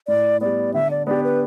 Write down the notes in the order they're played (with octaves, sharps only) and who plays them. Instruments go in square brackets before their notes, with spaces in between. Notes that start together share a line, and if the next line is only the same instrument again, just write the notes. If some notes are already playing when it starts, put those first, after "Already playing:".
[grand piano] A2 [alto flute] D5
[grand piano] G3 B3 [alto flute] D5
[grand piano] D3 [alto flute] E5
[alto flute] D5
[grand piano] B3 D4 G4 [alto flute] D5
[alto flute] B4